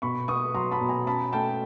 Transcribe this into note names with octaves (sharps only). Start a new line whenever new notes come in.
B2 B5 C#6
B3 C#6 D#6
F#3 A#5 C6
A5 B5
B2
G#5 A#5
C#4 A5 B5
A3 G5 A5